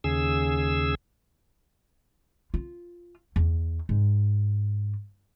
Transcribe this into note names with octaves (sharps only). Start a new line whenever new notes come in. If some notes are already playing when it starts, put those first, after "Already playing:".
D#2 C#3 G#4 E6
F4
E2
G#2